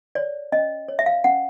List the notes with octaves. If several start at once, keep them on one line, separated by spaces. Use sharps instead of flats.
C#5 D5
C#4 D#5
C#5
E5
F5
C#4 F#5